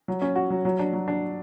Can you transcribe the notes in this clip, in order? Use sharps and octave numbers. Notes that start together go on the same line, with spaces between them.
F#3
C#4
F#4
F#3
F#3
D4
F#3
D4